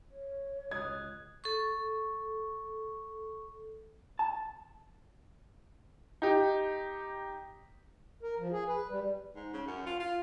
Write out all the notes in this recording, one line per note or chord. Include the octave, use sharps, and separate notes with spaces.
C#5
C#2 D#5 D#6 F#6 G#6
A4 C#6
A5
D#4 G4
A#4
F3
G#4
B4
G3
G#2
C#3
F#2
F4
F4